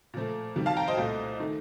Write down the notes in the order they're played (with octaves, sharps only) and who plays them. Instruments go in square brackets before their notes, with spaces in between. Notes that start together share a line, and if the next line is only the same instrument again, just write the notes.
[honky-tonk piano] A#2 F3 A3
F2 D#3 G3
F5 A5
G5 A#5
C5 D#5
C2 A#2 A3
D#3 A3